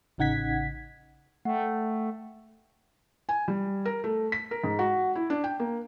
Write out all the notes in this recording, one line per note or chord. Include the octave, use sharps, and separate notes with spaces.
A1 C#3 D#4 F#5 G#6 B6
A3 F#5 G5
G#5
G3
A#4
A3
B6
A#4
G#2
F#4
E4
D4
G5
A#3